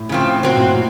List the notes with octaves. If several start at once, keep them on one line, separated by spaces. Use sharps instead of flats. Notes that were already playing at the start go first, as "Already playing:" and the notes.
Already playing: A2
C#3 F3 C4
A#2 F#3 C4 F#4
A2
A#2